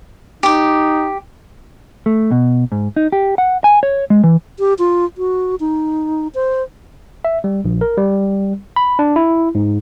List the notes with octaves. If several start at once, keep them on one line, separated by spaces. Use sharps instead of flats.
D#4 G4 D6
A3
B2
G#2
D#4
G4
F#5
G#5
C#5
G#3
E3
G4
F4
F#4
D#4
C5
E5
G3
A#1
A#4
G3
B5
D4
E4
G#2